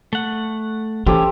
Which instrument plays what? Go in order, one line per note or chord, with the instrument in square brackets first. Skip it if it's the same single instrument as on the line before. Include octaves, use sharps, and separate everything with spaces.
[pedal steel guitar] A3 F#5
[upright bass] E3 [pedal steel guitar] C#4 [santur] G4 A4 C5